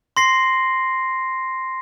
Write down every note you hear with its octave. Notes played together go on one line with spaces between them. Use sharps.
C6 A#6 C7